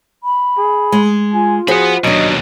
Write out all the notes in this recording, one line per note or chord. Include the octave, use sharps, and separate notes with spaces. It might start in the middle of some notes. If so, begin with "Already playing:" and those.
B5
G#4
G#3
F4 G#5
F3 F#4 G#4 C5 F#5 B5
D#2 B2 F#3 D4 D#5